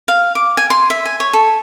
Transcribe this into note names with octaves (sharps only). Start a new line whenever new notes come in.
F5
D6
G#5
C6
E5
G#5
C#5
A4